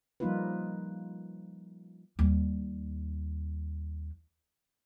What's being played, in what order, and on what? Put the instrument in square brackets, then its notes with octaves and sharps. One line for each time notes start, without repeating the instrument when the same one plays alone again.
[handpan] F3 G3 A#3 D#4 F4 B4
[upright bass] D#2 G3